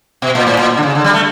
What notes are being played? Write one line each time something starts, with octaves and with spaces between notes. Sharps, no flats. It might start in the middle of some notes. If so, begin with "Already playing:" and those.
B2
A#2
A2
A#2
D3
C#3
D3
G3
A3